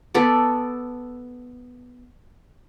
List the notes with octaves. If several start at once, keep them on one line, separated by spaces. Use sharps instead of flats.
B3 A4 D5